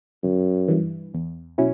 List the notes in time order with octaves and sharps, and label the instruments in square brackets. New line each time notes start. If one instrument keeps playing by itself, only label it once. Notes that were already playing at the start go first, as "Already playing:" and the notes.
[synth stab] G1 [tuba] F#2
[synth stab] G2 E3
E2
B2 F#3 C#4 E4